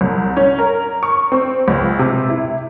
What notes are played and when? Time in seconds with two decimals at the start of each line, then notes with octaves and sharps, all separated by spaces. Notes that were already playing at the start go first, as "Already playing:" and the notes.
0.01 C2
0.37 C#4
0.59 A#4
1.03 C#6
1.32 C4
1.68 C#2
1.99 C3
2.29 E4